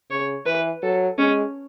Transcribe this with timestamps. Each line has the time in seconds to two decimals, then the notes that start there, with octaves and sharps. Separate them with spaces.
0.10 C#3 C#5
0.46 E3 B4
0.83 F#3 A4
1.18 G#3 C#4